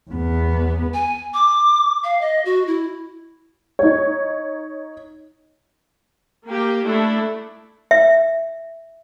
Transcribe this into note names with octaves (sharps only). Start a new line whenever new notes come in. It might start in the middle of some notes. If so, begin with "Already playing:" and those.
E2 B3
G#5
D6
F5
D#5
F#4
E4
D#4 C#5
A#3 G4
A3 D4 E4
E5